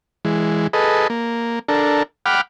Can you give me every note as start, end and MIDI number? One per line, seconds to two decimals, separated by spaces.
0.25 0.67 52
0.25 0.67 56
0.73 1.07 68
0.73 1.07 69
0.73 1.07 71
0.73 1.07 75
1.10 1.59 58
1.69 2.03 62
1.69 2.03 69
1.69 2.03 70
2.26 2.41 78
2.26 2.41 79
2.26 2.41 83
2.26 2.41 86
2.26 2.41 89